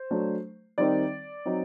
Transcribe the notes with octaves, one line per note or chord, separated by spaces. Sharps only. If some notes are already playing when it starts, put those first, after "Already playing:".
Already playing: C5
F#3 A3 D4
D#3 G3 C4 D#4 D5
F#3 C4 D#4